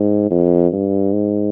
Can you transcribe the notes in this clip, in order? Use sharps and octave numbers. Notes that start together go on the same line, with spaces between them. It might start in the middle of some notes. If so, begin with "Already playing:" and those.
Already playing: G#2
F2
G2
G#2